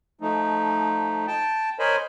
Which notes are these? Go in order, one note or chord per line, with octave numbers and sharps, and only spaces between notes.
F3 A3 D#4
G5 A5
A#4 C5 C#5 D#5 G#5 B5